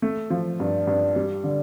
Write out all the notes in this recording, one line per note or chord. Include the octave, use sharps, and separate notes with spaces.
A3
F3
G2
G2
G3
D3